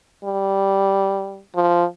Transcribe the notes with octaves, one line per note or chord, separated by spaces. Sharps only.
G3
F3